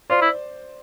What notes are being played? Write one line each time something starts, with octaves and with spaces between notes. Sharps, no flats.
F4 C5 D5
E4